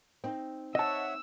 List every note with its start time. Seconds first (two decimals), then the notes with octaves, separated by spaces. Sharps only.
0.24 C4 D#4
0.75 C#5 D#5 E5 F#5 A5 E6